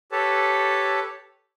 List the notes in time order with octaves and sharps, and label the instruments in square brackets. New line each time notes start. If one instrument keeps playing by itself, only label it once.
[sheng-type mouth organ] G4 A4 B4 C#5 A5